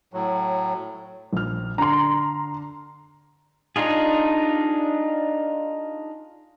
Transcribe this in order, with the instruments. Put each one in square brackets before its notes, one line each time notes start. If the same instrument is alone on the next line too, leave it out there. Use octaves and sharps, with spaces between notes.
[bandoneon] A2 F#3
[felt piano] A#1 F6
[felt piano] D3 D4 [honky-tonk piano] A#5 C6
[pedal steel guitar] D4 D#4 F4 G#4